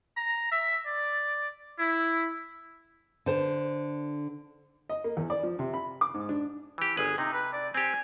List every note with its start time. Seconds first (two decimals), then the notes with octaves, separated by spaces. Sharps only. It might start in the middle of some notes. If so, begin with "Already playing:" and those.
0.17 A#5
0.51 E5
0.86 D5
1.80 E4
3.26 D3 C5 A5
4.89 D#5
5.04 A#3
5.17 E2
5.30 D5
5.43 F3
5.59 C3
5.74 B5
6.01 D6
6.14 G#2
6.29 D4
6.78 E3 G4
6.97 G1 G#4 B4
7.18 C3 D#4
7.33 B4
7.53 D5
7.74 C4 G4 G#5